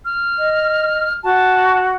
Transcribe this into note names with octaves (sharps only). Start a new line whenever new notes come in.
F6
D#5
F#4 A5